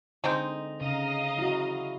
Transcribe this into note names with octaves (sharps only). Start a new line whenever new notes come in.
D3 G#3 C4 D#4
C#3 D#5 F5 A#5
E4 F#4